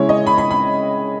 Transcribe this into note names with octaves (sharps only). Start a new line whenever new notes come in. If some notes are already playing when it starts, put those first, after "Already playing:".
Already playing: C#3 G#3 C#4 E4 C#5
D#5
B5
B5
B5